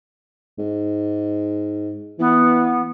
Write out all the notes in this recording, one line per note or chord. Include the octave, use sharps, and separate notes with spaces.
G#2
E3 B3